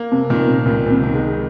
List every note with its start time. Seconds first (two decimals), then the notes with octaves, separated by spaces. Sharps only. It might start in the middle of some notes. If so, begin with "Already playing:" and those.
Already playing: A#3
0.12 C3
0.30 A#2 D#3
0.48 C3
0.66 C#2 A#2
0.86 A#2
0.91 C3
1.03 D#3
1.14 G#3